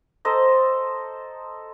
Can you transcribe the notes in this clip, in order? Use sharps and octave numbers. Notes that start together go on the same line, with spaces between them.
A4 C5 D#5 A#5